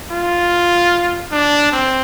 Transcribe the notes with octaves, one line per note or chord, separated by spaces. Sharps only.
F4
D4
C4